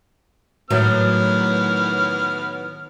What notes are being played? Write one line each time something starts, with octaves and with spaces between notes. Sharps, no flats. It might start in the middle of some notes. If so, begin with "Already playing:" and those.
A2 D#3 F#3 B3 F6